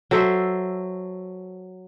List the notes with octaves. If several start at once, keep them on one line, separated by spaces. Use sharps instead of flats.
F#3 A4 C5 E5